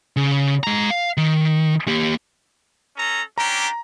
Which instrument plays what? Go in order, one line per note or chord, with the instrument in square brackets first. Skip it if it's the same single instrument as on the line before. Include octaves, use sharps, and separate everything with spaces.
[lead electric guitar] C#3
G#3 A#5
F5
D#3
A#3 G4
[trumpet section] C#4 A4 A#5
[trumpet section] C#4 D4 G4 [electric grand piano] A#5